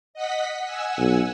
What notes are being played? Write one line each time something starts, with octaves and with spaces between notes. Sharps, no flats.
D#5 F#5 B6
F#5 G#5 E6
B1